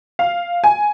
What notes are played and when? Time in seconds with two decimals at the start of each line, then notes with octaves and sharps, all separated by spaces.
0.19 F5
0.64 G#5